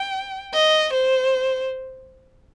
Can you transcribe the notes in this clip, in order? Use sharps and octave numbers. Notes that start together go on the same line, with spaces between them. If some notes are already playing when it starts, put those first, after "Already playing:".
Already playing: G5
D#5
C5